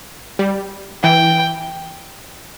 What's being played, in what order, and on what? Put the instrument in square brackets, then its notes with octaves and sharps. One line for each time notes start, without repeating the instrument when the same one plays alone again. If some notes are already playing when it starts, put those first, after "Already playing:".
[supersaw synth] G3
[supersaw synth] E3 [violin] G5